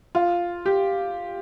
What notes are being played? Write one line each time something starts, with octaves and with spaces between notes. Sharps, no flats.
F4
G4